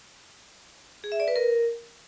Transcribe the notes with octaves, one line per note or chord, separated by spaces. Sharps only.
G#4
E5
D5
B4
A#4